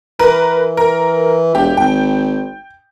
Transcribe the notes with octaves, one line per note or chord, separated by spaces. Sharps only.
E3 A#4 B4
A#4
E1 G4
G#1 G5